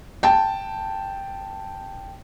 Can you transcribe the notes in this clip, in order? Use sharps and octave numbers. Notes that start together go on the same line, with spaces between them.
G5 A5